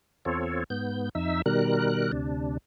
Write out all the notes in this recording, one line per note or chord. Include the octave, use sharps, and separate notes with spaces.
E2 C4 F4 A4 C#5
G#2 B3 G6
F2 D#4 E5 E6
B2 D#3 G3 A#4 F#6
D2 C3 D4